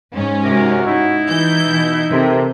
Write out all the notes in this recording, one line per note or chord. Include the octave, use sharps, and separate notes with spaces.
G#2 C#4
C3 F#4 A#4
D#4 E4
E3 G6
B2
C3 G4 A4 A#4